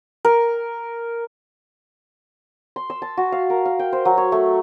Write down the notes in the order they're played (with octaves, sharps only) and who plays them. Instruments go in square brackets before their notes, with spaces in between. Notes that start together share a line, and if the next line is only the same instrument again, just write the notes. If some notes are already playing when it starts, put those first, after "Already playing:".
[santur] A#4
C6
E6
A5
F#4
F5
A#4
F5
G5
C5
F#3
C#5
A3